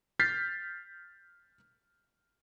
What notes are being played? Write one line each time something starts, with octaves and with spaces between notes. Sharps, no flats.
F6 G6 A6 B6 C7